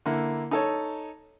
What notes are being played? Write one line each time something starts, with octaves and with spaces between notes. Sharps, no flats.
D3 A#3 E4
D#4 A4 C#5